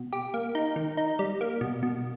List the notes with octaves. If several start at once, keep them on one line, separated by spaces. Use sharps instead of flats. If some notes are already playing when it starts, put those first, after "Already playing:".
Already playing: B2
G4
A#3
D#4
D#3
D#4
G3
A#3
B2
B2